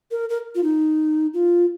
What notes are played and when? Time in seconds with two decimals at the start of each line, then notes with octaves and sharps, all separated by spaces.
0.11 A#4
0.29 A#4
0.55 F4
0.63 D#4
1.33 F4